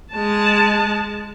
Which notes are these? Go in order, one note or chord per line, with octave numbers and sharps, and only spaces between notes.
G#3 A5